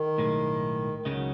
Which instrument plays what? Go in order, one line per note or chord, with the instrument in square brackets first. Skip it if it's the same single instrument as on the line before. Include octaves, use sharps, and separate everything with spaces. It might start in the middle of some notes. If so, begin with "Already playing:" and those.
Already playing: [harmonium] D#3
[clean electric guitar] B1 A2 G#3
[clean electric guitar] C#2 C#3 G#3 D#4 [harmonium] F#3